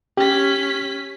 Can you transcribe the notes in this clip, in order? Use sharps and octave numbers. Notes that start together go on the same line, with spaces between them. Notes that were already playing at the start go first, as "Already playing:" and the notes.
C#4 G4 B6